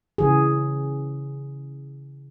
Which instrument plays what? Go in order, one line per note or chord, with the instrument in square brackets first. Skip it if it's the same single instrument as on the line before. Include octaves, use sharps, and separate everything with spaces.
[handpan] C#3 E3 G#4